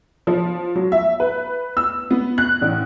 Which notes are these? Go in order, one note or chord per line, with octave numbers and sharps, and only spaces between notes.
F3
F#3
E5
B4
E6
B3
F#6
A1